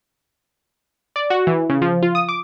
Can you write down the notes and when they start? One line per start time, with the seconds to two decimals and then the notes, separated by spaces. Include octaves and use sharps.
1.16 D5
1.30 F#4
1.47 E3
1.70 C#3
1.82 F3
2.03 F4
2.15 D#6
2.29 D6